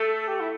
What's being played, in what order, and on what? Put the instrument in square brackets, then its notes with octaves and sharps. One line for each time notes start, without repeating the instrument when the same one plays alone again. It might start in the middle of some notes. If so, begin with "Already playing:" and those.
Already playing: [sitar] A3 [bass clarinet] A4
[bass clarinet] G4
E4